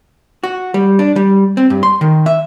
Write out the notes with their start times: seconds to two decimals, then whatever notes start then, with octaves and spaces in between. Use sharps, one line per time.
0.43 F#4
0.74 G3
0.99 D4
1.16 G3
1.57 C4
1.70 G2
1.83 C6
2.01 D#3
2.26 E5